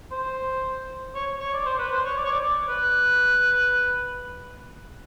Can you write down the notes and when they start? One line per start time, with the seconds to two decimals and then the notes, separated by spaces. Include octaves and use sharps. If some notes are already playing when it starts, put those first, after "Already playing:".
0.11 C5
1.15 C#5
1.40 C#5
1.54 D5
1.66 C5
1.79 B4
1.92 C5
2.04 C#5
2.17 D5
2.25 C#5
2.32 D5
2.68 B4